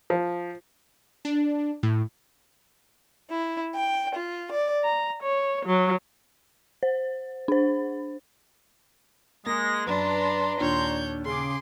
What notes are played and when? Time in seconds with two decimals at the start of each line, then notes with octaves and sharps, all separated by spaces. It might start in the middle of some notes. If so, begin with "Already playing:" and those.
0.10 F3
1.25 D4
1.83 A2
3.29 E4
3.75 G5
4.15 F4
4.52 D5
4.85 A#5
5.23 C#5
5.67 F#3
6.83 C5
7.48 D4 C5
9.46 G#3 A#3 A#6
9.87 F#2 D4 B4 A5 A#5 C6
10.60 D#2 A#2 D4 C#5 G6
11.25 C#3 G#4 C6 D6